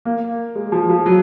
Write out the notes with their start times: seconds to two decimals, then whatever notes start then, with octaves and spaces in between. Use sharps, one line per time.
0.05 A#3
0.55 G#3
0.72 F3
0.89 F3
1.06 F#3